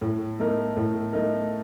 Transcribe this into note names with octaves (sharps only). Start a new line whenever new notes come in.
A2
A3 D#4 A#4
A2
A3 D#4 A#4